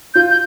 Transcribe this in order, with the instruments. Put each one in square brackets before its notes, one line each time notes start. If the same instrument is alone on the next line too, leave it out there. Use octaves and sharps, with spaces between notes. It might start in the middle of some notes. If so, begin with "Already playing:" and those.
[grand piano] F4 [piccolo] G6
[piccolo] G6